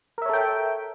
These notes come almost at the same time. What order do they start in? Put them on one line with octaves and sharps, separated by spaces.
A#4 E5 C#5 A4 G5